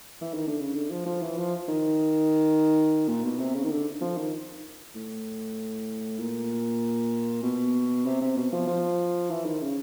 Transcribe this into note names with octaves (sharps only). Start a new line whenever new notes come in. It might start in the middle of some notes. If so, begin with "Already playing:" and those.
E3
D#3
D3
C#3
D3
F3
F3
E3
F3
D#3
A#2
B2
C3
C#3
D#3
D3
F3
D#3
A2
A#2
B2
C3
C3
B2
F3
F3
E3
D#3
C#3